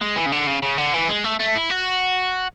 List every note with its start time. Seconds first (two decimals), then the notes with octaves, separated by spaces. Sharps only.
0.01 G#3
0.16 E3
0.26 C#3
0.32 D3
0.47 C#3
0.63 C#3
0.78 D3
0.94 E3
1.09 G#3
1.24 A3
1.40 A3
1.55 E4
1.70 F#4